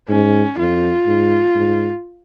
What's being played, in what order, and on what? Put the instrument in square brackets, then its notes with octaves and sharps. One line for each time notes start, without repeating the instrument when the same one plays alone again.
[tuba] G#2 [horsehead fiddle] C#4
[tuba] F2 [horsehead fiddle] F4
[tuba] G#2
G#2